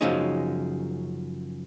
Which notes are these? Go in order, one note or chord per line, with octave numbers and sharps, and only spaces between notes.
F#2 C#3 F3 G#3 C#4 D#4